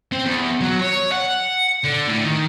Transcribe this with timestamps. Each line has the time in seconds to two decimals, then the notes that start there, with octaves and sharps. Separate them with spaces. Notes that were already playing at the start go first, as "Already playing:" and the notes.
0.12 C4
0.26 E2
0.61 F#3
0.81 C#5
1.12 F#5
1.84 D3
2.08 A2
2.24 D#3